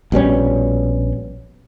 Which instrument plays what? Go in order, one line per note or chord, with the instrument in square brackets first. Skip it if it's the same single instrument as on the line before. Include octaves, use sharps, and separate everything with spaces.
[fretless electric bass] A#1 B2 G3 C#4